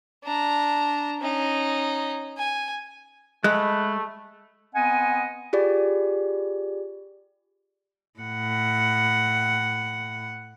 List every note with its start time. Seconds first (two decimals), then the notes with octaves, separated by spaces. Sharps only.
0.24 D4 A#5
1.21 C#4 D#4
2.38 G#5
3.44 G#3 A3 B5 F#6
4.75 B3 C4 D#5 F#5 G#5
5.53 F4 G4 G#4 D5
8.20 A2 F#5